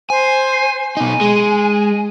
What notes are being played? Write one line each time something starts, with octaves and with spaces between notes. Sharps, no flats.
C5 G#5
B2 D#4 G#5
G#3